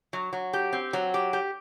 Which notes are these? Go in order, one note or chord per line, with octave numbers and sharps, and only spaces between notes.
F#3
F#3
G4
C4
F#3
G4
G4